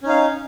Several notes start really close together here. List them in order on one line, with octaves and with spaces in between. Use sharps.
C#4 D#4 F5